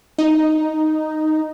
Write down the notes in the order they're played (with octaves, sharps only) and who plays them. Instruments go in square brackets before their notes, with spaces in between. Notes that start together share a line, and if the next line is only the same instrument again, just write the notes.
[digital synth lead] D#4